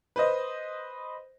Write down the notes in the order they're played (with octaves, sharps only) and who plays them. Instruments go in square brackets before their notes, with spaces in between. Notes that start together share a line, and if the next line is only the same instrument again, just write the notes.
[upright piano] B4 C5 D#5